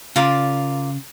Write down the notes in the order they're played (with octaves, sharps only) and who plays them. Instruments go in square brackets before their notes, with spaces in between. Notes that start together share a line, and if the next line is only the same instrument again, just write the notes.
[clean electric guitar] C#3 [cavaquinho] F4 A#4 D5